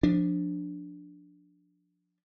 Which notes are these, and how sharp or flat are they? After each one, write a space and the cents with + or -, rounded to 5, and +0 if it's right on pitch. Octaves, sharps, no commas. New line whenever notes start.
F3 +15 D4 +0